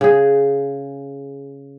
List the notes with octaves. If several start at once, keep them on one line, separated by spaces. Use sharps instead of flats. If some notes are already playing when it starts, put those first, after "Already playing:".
C#3 G#4